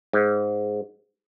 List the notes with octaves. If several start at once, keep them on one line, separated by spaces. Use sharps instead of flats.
G#2